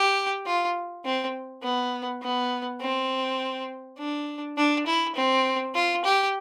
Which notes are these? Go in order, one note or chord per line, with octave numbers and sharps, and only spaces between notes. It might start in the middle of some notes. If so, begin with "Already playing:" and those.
Already playing: G4
F4
C4
B3
B3
C4
D4
D4
E4
C4
F4
G4